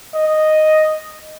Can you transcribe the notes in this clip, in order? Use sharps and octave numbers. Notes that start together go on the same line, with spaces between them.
D#5